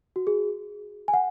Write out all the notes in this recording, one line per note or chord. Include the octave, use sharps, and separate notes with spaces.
F#4
G#4
G#5
F#5